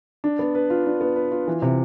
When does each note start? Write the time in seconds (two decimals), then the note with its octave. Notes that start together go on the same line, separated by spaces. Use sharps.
0.24 D4
0.39 B3
0.55 B4
0.70 F4
0.86 D4
1.01 B3
1.16 B4
1.32 F4
1.48 E3
1.62 C3